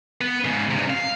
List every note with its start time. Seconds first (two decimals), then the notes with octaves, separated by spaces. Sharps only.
0.21 B3
0.45 G#2 C#3
0.71 G2 C3
0.90 F5